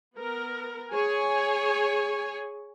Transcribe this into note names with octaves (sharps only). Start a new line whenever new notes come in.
B3 A#4
G#4 C#5 G#5